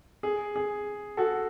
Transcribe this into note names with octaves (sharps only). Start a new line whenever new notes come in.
G#4
G#4
F#4 A4